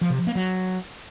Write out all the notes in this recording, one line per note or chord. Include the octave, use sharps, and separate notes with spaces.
F3
C3
F3
A#3
F#3